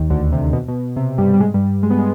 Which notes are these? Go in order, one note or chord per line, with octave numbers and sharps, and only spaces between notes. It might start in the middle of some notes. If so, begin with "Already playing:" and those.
Already playing: D#2 D#3
D2 D3
C3
B2
B2
C3
G2 G3
G3
G#2 G#3
G2 G3
G#3
B3
G#3